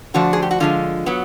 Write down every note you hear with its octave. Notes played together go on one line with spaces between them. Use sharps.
D3 F3 A3 D4 F#4
G#4
G4
F#4
D3 F3 G#3 F4
F#3 B3